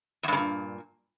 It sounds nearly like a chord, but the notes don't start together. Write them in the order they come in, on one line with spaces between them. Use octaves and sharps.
E2 G2 C#3 A#2